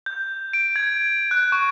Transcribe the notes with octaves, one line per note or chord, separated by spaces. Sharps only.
G6
D7
G#6
F#6
C#6